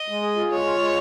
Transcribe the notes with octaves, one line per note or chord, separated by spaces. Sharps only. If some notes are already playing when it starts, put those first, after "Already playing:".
Already playing: D#5
G#3
G#4
F4
G#3 C#5
F4
G#3